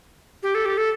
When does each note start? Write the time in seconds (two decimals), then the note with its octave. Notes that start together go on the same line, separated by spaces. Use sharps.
0.43 G4
0.55 A4
0.65 G4
0.77 A4